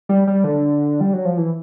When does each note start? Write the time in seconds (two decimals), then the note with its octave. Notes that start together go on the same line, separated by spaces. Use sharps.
0.09 G3
0.27 G3
0.44 D3
1.01 G3
1.13 F#3
1.25 F3
1.38 E3